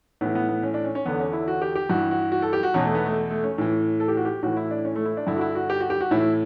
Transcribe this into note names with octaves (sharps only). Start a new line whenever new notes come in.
A2 E3 B3
B3
B3
C#4
D4
C#4
C#4
E2 D3 B3
C#4
E4
F#4
G4
G4
G2 E3 F#4
F#4
F#4
A4
G4
F#4
E2 B2 C#4
A3
B3
A3
A3
C#4
A2 E3
A4
G4
F#4
G4
A2 E3 F#4
E4
D4
C#4
A3
E4
D4
G2 D3 E4
F#4
E4
F#4
G4
F#4
G4
F#4
A2 E3 E4